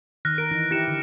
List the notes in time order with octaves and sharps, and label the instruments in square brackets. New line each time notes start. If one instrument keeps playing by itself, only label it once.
[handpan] D#3 [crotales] F6 F#6 A#6
[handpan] A#4 [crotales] D7
[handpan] E3 D#4
[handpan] E4 G4 [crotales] A#6 C#7 E7
[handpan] D3